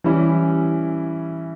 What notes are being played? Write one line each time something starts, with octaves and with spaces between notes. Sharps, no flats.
E3 G3 C#4 E4